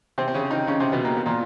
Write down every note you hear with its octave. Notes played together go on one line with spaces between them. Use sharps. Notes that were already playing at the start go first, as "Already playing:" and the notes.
C3 C4
C4
C#3 C#4
D#3 D#4
C#3 C#4
C3 C4
B2 B3
A#3
B3
A#2 A#3